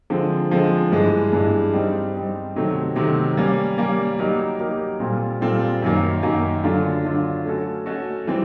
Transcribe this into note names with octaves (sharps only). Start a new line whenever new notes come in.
D3 F3 G#3 C4
D3 F3 G#3 C4
G2 E3 G#3
G2 E3 G#3
G3 C4 D#4
G3 C4 D#4
C3 D#3 F#3 A3 C4
C3 D#3 F#3 A3 C4
G3 A#3 C#4
G3 A#3 C#4
F#3 A#3 D#4 G4 A#4
F#3 A#3 D#4 G4 A#4
A#2 G3 C4 F4 A4
A#2 G3 C4 F4 A4
F#2 D#3 F#3 A#3
F#2 D#3 F#3 A#3
D3 F#3 A3 D4 F4
D3 F#3 A3 D4 F4
A3 C#4 F#4 A4
A3 C#4 F#4 A4
E3 G3 C4